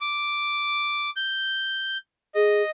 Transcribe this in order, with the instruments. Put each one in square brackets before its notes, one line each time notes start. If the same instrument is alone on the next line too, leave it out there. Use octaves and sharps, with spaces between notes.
[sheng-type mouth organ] D6
G6
[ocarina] G#4 [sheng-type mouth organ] D#5